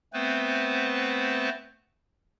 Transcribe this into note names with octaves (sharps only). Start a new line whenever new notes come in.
A3 B3 C4 B4 C5